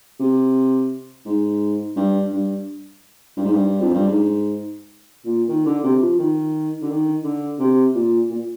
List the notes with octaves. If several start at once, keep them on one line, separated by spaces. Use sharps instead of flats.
C3
G#2
G2
G2
G2
G#2
G2
F2
G2
G#2
A#2
D#3
D3
C3
F3
D#3
D3
D#3
D3
C3
A#2
A#2